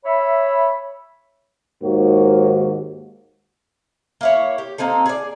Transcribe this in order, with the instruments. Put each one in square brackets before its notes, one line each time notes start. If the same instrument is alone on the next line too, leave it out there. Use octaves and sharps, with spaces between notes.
[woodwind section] C#5 E5 B5
[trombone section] D#2 G#2 D#3 A#3 F#4
[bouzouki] A#3 E4 C#5
G4
A#3 C4 D#4 A4
G#4 D5